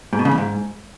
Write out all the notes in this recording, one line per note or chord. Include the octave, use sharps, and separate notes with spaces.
G#2
B2
C#3
E2
G#2